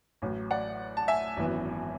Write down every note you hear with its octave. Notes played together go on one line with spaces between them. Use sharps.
A1 A2 F#3
D5 F#5
A5
E5 G#5
G#1 F#2 E3 B3